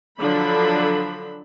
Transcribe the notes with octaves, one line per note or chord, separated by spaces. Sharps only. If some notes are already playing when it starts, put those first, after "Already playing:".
D3 F3 F#3 D4 B5